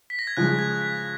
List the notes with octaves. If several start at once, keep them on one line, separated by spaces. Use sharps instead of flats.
B6
A#6
G#6
C#3 F3 G#3 F#6
G#6
B6